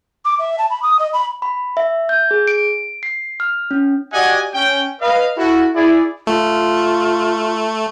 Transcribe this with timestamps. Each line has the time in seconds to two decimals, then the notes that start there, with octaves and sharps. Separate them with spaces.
0.25 D6
0.39 E5
0.58 A5
0.70 B5
0.83 D#6
0.99 D#5
1.13 B5
1.42 B5
1.77 E5
2.09 G6
2.31 G#4
2.48 D7
3.03 C7
3.40 F6
3.71 C#4
4.13 F#4 G4 D5 D#5 F#5 G#5
4.54 C#4 G5
5.01 B4 D#5 F5
5.38 E4 F#4 A4
5.75 E4 G#4 D5
6.27 A3 F4